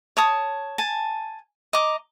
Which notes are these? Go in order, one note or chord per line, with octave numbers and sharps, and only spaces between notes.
C#5 A5 D#6
G#5 A5
D#5 A#5 D6